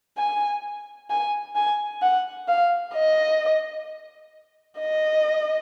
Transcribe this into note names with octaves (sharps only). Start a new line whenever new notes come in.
G#5
G#5
G#5
F#5
F5
D#5
D#5